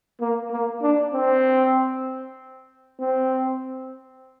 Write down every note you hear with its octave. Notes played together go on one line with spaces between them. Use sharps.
A#3
A#3
D4
C4
C4